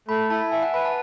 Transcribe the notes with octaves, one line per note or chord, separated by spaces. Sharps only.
A3 B5
E4 A5
E5 G#5
F#5
B4 B5
A5